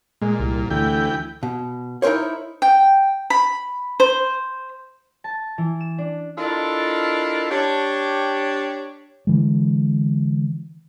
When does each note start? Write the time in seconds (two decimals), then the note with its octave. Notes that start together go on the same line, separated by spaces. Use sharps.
0.22 A#2 G#3
0.40 C2
0.70 D2 E3 G5
1.43 B2
2.02 D#4 E4 A#4 C5 C#5
2.62 G5
3.30 B5
4.00 C5
5.24 A5
5.58 E3
5.81 E7
5.98 D4
6.38 D4 E4 F4 A4 A#4 D#5
7.51 D4 G4 C#5
9.27 D3 E3 G#3